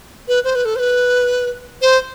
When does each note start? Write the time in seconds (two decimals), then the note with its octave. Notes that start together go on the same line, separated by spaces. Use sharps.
0.28 B4
0.44 C5
0.55 B4
0.65 A4
0.76 C5
0.79 B4
1.82 C5